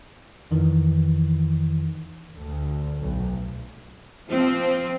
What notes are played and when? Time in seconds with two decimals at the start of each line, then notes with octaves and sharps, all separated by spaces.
0.51 F2 D#3 E3
2.35 D2
3.01 B1
4.30 F3 C4